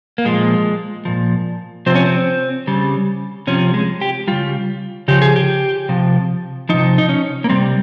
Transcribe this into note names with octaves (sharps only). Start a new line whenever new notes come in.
A#3
A#2 F3 G#3
A#2 F3
C3 F3 C4
C#4
C4
C#3 G3
C3 F3 C#4
G#3
G4
C#3 G3 F4
C#3 F3 G4
G#4
G4
C3 F3
C3 F3 D#4
D#4
C#4
A#3
C3 G3 C4